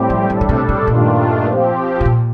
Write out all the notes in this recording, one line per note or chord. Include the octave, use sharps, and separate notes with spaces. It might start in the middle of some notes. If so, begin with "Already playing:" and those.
Already playing: A2 G3 C4 G4
F3
A2 D3 G3 D4 A4
D3
C3
C3
G2 A#2 D#3 A3 D4 F4
F3 C4 G4
C3
A#2